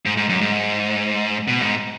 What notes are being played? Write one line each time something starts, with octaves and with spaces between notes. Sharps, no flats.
G#2
G#2
F#2
G#2
B2
G#2